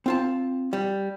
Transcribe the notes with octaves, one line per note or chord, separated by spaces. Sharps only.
C4 F4 A5
G3